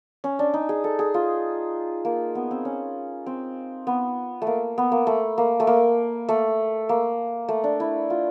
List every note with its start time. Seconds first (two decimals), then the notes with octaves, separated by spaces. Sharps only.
0.24 C#4
0.39 D4
0.54 D#4
0.69 G#4
0.84 A4
0.99 G#4
1.14 F4
2.05 A#3
2.35 B3
2.51 C4
2.65 C#4
3.26 C4
3.87 B3
4.42 A3
4.47 A#3
4.78 B3
4.92 A#3
5.07 A3
5.38 A#3
5.60 A3
5.67 A#3
6.29 A3
6.89 A#3
7.49 A3
7.64 D4
7.80 E4
8.10 F4